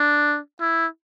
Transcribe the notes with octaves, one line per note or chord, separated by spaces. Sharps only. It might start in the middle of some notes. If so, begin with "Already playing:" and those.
Already playing: D4
E4